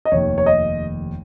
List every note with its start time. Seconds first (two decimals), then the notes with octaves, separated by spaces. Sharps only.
0.05 D#5
0.12 F1 D#2 D#3 C#5
0.38 C#5
0.46 D#5